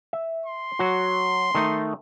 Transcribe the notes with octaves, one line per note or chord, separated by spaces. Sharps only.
E5
C6
F#3 F#4
D#3 A3 D#4